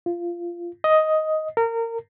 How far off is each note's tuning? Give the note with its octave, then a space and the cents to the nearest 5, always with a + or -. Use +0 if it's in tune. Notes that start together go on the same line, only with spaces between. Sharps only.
F4 -15
D#5 +10
A#4 -25